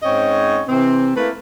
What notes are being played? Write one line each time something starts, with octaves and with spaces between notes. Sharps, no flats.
G#2 C4 C#4 C#5 D#5
C3 E3 C4
A3 A#3 E4 B4